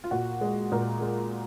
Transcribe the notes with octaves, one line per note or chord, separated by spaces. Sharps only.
F4
A#2 F#4
G#3
A#2 A#4
G#3